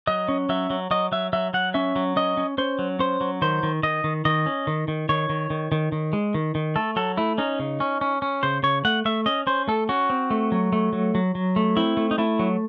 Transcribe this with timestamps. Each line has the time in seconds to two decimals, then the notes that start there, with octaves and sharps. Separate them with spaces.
0.07 F#3 D#5
0.28 C#4
0.49 F#3 E5
0.70 F#3
0.91 F#3 D#5
1.12 F#3 E5
1.33 F#3 E5
1.54 F#3 F#5
1.74 C#4 E5
1.96 F#3
2.16 C#4 D#5
2.37 C#4
2.58 C#4 C5
2.79 F#3
2.99 C#4 C5
3.21 F#3
3.42 D#3 C5
3.63 D#3
3.83 D#3 D#5
4.04 D#3
4.25 D#3 D#5
4.46 C#4
4.67 D#3
4.88 D#3
5.09 D#3 C#5
5.29 D#3
5.50 D#3
5.72 D#3
5.92 D#3
6.13 G#3
6.34 D#3
6.55 D#3
6.76 A3 A4
6.96 F#3 A4
7.17 A3 E4
7.38 C#4 D#4
7.59 C#3
7.80 C#4
8.01 C#4
8.22 C#4
8.43 C#3 C5
8.63 C#3 C#5
8.85 A3 F#5
9.05 A3 E5
9.26 C#4 D#5
9.47 C#4 C5
9.68 A3 A4
9.89 C#4 F#4
10.10 C4
10.30 A3
10.52 F#3
10.73 A3
10.93 F#3
11.15 F#3
11.35 F#3
11.56 A3
11.77 C4 E4
11.97 A3
12.11 D#4
12.18 A3 E4
12.39 F#3